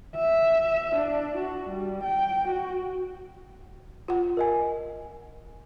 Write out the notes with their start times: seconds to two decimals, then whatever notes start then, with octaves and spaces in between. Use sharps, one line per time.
0.16 E5
0.95 D4
1.37 F#4
1.69 G3
2.03 G5
2.48 F#4
4.08 F4 F#5
4.37 A#4 D#5 G#5